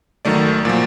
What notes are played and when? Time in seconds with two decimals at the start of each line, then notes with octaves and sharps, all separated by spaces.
0.25 G#1 D#3 F#3 A3 D5
0.65 A#2 F3 F#3